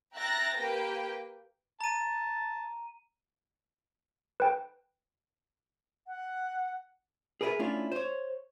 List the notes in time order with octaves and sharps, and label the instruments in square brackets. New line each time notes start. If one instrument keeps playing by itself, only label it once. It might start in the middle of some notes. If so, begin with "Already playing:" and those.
[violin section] E5 G5 A#5 F#6 A6 A#6
A#3 G4 B4 G5
[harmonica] A5 [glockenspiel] A#5 D#7
[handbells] B4 G5
[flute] F#5
[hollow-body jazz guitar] G#4 A#4 B4 C#5 E5
A3 C#4 D4 E4 F4
C5 C#5